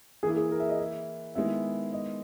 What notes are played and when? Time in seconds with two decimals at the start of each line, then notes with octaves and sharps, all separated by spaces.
0.23 E3 A#3 E4 G#4
0.36 G#4
0.52 A#4
0.60 E5
0.69 D#5
0.79 E5
1.35 D#3 G#3 B3 E4 E5
1.93 D#5